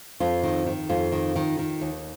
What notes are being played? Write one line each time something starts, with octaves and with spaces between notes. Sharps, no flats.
F2 F4
D#3
D#3
F2 F4
D#3
D#3
D#3
D#2